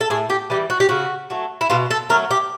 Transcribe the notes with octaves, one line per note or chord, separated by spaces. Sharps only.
A4
A2 G#4
G4
E3 G3 G4
F#4
G4
C#3 F#4
F#3 A3
E4
B2 F4
A4
F#3 A3 A#4
G4